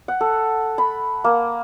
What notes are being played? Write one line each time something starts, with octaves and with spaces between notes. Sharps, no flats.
F#5
A4
B5
A#3